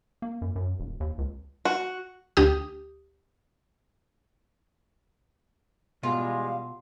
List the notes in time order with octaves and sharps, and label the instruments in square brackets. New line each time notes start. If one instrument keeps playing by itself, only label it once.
[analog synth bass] A#3
F#2
F#2
E1
D#2
C#2
[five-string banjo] F#4
[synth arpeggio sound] D2 G4 D#6
[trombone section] E2 G3 G#3 [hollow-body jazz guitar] B2 [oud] F4 [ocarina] F5